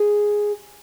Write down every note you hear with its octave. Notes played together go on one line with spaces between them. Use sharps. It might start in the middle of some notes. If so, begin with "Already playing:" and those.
Already playing: G#4